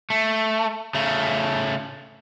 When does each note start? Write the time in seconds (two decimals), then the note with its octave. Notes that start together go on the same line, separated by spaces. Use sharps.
0.10 A3
0.95 C#3 A3